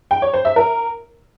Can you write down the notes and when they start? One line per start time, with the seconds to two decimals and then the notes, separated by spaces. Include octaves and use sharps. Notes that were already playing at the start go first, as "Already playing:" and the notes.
0.11 G5
0.22 C#5
0.34 C5
0.45 E5
0.56 A#4